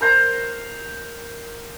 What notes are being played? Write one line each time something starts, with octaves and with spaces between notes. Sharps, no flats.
A#4 C5 A#5